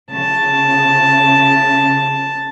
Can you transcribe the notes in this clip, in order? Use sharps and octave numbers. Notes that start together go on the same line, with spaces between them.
C#3 A5